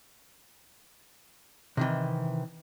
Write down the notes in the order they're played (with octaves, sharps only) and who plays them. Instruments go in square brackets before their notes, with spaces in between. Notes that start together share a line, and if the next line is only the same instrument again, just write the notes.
[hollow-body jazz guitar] C3 D#3 E3